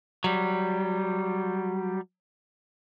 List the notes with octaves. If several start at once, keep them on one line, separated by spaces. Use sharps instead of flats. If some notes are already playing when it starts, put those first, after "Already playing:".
F#3 G3